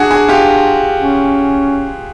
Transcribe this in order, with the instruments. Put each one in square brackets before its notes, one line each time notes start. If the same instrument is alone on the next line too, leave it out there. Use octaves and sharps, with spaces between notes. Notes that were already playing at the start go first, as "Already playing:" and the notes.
Already playing: [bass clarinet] D4 [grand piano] F#4 G#4
[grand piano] F#4 G#4
F4 G4
[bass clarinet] C#4